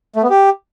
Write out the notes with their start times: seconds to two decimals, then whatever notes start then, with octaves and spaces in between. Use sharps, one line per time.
0.16 A3
0.23 B3
0.30 G4